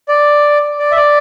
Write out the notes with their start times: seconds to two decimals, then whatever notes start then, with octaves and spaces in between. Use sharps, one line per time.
0.09 D5
0.79 D5
0.91 E5
0.97 D5